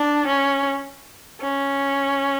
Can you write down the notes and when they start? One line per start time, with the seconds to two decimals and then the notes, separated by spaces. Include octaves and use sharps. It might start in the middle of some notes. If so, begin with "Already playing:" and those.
Already playing: D4
0.27 C#4
1.41 C#4